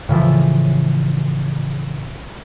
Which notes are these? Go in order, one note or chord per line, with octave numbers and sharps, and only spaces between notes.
A2 C#3 E3 F3